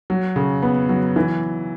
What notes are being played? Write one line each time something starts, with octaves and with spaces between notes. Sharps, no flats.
F#3
C#3
B3
F#3
E3